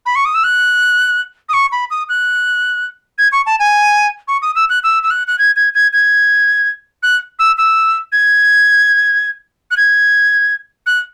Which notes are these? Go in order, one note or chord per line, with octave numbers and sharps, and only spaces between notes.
B5
C#6
D#6
E6
F#6
D#6
C#6
B5
D#6
F#6
G#6
C#6
A5
G#5
C#6
D#6
E6
F#6
E6
E6
F#6
F#6
G#6
G#6
G#6
G#6
F#6
E6
E6
G#6
F#6
G#6
F#6